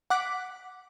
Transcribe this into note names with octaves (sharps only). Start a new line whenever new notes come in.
F#5 D6 F#6 B6